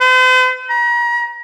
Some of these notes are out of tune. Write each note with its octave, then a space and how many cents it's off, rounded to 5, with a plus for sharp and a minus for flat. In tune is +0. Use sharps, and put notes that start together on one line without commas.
C5 -45
A#5 +40